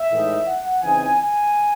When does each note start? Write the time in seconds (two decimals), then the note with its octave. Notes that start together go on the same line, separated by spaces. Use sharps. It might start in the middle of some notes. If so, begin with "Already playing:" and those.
Already playing: E5
0.10 A2 E3 G#3 D#4
0.47 F#5
0.83 C#3 E3 C4 D#4 G#5
1.21 G#5